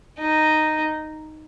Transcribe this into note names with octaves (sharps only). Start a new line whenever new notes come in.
D#4